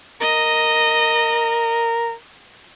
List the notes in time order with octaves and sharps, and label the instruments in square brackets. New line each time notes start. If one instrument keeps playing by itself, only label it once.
[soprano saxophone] A#4 [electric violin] D#5